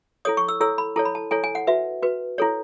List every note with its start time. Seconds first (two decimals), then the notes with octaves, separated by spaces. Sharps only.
0.25 E4 A4 C#5 D#6
0.37 C#6
0.48 E6
0.61 E4 A4 C#5 E6
0.78 B5
0.96 E4 A4 C#5 A5
1.05 B5
1.15 A5
1.31 E4 A4 C#5 G#5
1.44 G#5
1.55 F#5
1.67 F#4 B4 E5
2.03 F#4 B4
2.38 E4 A4 C#5